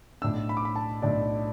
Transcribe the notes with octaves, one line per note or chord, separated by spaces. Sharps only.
B1 A2 A3 D4 E6
B5
D6
B5
A5
B1 A2 A3 D4 D5